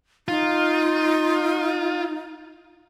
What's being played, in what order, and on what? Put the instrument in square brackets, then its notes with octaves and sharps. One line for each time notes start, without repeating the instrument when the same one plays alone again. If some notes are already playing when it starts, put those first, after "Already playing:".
[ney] D#4 [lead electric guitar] F4